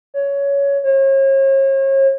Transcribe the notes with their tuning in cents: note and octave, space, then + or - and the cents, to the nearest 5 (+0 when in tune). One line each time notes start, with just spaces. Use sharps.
C#5 +15
C#5 -40